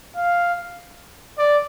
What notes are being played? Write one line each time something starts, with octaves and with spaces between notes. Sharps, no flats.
F5
D5